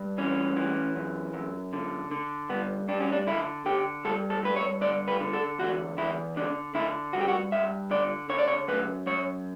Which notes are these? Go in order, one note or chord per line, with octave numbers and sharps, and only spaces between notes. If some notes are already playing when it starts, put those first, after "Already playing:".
Already playing: G2
E3 C#4
E3
F#2
F#2
D3
D3
G2 B3
G2 D4
C#4
D4
D3 E4
D3 G4
G2 A4
A4
G2 B4
C#5
D3 D5
B4
D3
A4
E2 F#4
E2 E4
D3 D4
D3 E4
G2 F#4
G4
F#4
G2 E5
D3 D5
D3 C#5
D5
C#5
F#2 B4
F#2 C#5